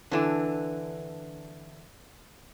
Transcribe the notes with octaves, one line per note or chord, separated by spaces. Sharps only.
D3 E3 D4